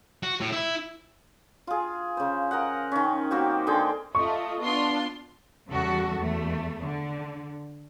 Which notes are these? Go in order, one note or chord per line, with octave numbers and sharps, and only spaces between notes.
F#4
A2
E4
F4 G#4
C#3 C5
A#4 D#5 F#5
D#3 C#4
A#3 C4 F#4 G4
D3 G#4 G5 C6
A3 F4 A4 D#5 C#6
B3 D4 F4 D5 C6
E2 C#3 G3 F#4 A4
E2 A3
D3